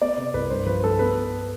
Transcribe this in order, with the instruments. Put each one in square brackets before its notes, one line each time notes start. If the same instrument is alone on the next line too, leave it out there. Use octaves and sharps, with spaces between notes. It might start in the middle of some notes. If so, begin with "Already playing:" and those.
[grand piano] B3 D5
C3
C2 B4
G2 C5
F3 B4
G2 A4
B3 B4